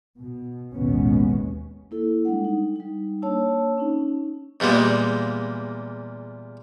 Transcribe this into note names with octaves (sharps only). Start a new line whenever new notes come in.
B2
A1 D#2 B2 G#3 B3 C#4
A#3 E4 A4
G3 G#3 D4 F#5
D#4
G3 D#4
A#3 D4 C#5 A5 E6
C#4 D#4
E2 A#2 G3 G#3 A#3